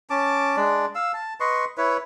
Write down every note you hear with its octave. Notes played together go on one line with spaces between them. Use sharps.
C#4 A5 D6
G#3 D4 D5
F5 E6
A5
B4 D#5 C6 C#6
E4 B4 C#5